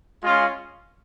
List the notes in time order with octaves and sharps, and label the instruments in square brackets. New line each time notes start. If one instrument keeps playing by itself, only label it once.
[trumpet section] G#3 C#4 F4